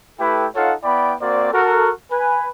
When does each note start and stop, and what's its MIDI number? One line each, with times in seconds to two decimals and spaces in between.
0.20 0.47 57
0.20 0.47 64
0.20 0.47 67
0.20 0.47 69
0.20 0.47 71
0.20 0.47 79
0.55 0.73 63
0.55 0.73 65
0.55 0.73 69
0.55 0.73 73
0.55 0.73 77
0.55 0.73 78
0.84 1.14 59
0.84 1.14 64
0.84 1.14 74
0.84 1.14 79
0.84 1.14 83
1.21 1.53 58
1.21 1.53 60
1.21 1.53 66
1.21 1.53 72
1.21 1.53 74
1.53 1.91 66
1.53 1.91 69
1.53 1.91 70
2.11 2.47 71
2.11 2.47 80